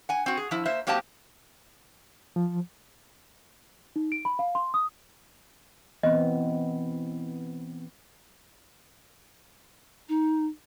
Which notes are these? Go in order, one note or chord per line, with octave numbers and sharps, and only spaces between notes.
F#5 G#5
C4 F#4
G#4
F3 E4
A#3 C5 E5
F#3 A#3 C4 G4 D#5 A5
F3
D#4
D7
B5
F5
C6
D#6
E3 B3 C4 D#5
D#4